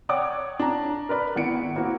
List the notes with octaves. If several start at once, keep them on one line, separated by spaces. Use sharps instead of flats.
C#5 D5 F#5 G5 D6 D#6
D4 A#5
A#4 B4 D5 B5
G#1 B3 E4 C#7 D7
A#3 C4 E4 F#4